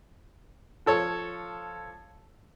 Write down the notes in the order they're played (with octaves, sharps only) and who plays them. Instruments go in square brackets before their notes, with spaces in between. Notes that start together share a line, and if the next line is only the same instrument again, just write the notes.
[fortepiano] F3 A4 C#5